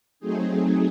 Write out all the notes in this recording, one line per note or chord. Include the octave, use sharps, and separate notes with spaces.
F#3 A3 C4 D#4 G#4